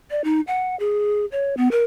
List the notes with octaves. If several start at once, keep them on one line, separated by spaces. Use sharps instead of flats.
D5
D#4
F#5
G#4
C#5
B3
A#4